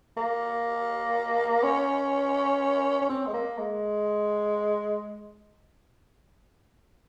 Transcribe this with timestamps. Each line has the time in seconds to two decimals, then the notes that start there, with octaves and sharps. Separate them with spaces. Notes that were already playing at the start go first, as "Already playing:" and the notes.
0.17 A#3
1.63 C#4
3.02 C#4
3.10 C4
3.27 G#3
3.34 A#3
3.58 G#3